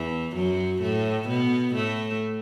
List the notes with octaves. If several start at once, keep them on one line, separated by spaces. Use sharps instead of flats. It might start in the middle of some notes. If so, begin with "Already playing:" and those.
Already playing: E2 E3
F#2 F#3
A2 A3
B2 B3
A2 A3